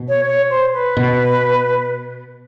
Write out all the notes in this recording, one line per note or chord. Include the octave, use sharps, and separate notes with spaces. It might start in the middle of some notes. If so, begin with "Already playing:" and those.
Already playing: B2
C#5
C#5
C5
B4
B2